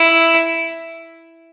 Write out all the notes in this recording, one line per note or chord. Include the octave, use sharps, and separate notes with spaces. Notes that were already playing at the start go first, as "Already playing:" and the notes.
Already playing: E4